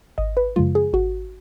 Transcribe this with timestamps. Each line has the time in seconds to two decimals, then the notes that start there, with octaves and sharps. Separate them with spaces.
0.18 G#1 D#5
0.37 B4
0.56 F#2 C#3 F3 G#3 F4
0.75 G#4
0.93 G#1 F#4